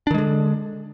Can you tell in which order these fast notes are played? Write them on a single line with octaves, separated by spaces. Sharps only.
D4 D#3 G#3 D3